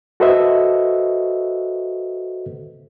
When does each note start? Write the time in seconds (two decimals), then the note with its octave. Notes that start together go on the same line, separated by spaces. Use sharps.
0.20 F#4 A4 B4 C5 D#5 E5